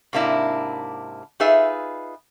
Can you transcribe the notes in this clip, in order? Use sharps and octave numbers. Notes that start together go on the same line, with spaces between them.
G#2 C3 A#3 D4 E4
D#4 F4 G#4 B4 E5